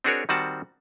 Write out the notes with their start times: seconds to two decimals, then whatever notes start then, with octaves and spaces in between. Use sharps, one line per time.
0.04 C4 D4 F#4 G#4 A#4 C#5
0.29 D#3 G3 C4 F#4 F#5 A5